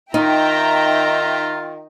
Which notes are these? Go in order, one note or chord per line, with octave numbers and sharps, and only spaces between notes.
D#3 D#4 F4 E5 G5 A#5